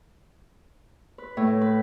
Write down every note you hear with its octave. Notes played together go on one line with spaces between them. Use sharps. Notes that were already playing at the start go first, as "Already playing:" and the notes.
B4
A2
B4